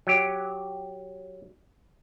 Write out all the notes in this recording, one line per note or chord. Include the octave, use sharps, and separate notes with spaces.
F#3 G4